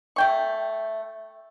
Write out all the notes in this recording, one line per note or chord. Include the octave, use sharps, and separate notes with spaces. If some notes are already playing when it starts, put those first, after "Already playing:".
A3 G5 C#6